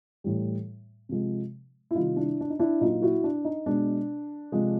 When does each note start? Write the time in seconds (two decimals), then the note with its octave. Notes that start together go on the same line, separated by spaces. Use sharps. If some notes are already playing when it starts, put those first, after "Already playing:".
0.24 A2 E3 G3
1.09 C3 F3 G#3
1.91 E4
1.95 C3 D#3 G3 D#4 F4
2.16 D4 E4
2.41 D4
2.50 D#4
2.60 D4 E4
2.81 A#2 F#3 D#4 F4
3.02 E4 F#4
3.24 D4
3.45 D#4
3.66 B2 G#3 D4
4.52 C3 F3 G#3